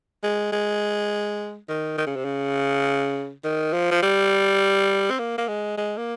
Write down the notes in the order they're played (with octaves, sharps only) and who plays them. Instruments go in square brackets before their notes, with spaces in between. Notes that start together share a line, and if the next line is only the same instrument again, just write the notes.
[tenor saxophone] G#3
G#3
D#3
D#3
C#3
C3
C#3
D#3
F3
F3
G3
C4
A#3
A#3
G#3
G#3
A#3